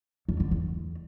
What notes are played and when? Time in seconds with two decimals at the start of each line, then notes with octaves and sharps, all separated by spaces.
0.29 E2
0.40 D3
0.51 E2